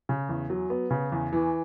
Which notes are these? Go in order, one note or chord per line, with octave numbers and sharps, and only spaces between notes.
C#3
E2
F#3
B3
C#3
E2
E3